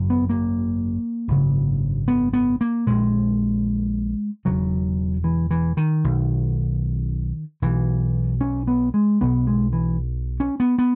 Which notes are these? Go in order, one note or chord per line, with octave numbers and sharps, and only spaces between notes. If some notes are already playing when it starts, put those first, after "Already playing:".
Already playing: G#1 F#2 C#3
B3
A#3
G#1 F#2 C#3
B3
B3
A#3
A#1 A#2 G#3
E1 D#2 C#3 F#3
E3
E3
D#3
B1 B2
B1 B2 E3
C#4
B3
G#3
B1 B2 B3
G#3
E3
C#4
B3
B3